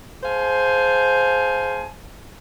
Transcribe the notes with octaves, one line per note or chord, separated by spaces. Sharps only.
G#4 C5 F5 G#5 A5